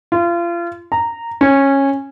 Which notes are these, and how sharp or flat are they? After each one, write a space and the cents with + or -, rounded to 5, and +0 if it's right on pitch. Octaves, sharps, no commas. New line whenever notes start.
F4 -30
A#5 -10
C#4 -15